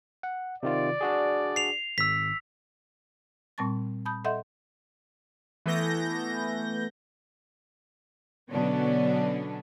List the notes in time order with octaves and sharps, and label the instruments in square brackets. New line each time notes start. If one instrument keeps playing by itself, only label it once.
[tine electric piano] F#5
[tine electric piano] C3 D#3 F4 [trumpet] D5
[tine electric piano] D4 F#4 G#4
[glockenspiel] C7 F7
[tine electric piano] G#1 [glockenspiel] E6 B6
[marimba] A#2 G3 C4 A5 C#6 A6
A5 B5 D#6 G6
A4 D#5 E5 F#5 C6 G6
[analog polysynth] E3 A3 B3 G6 A#6
[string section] B2 D3 F#3 B3 C#4 D4